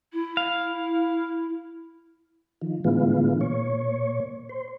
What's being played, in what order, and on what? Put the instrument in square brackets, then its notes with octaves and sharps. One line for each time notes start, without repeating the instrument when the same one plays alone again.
[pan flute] E4
[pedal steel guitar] F5
[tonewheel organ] D#3 F3
A2 D3 E3 G#3 B3 F4
A#2 C#5
C5